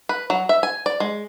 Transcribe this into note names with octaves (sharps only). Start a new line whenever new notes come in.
B4
F#3
E5
G#5
D5
G#3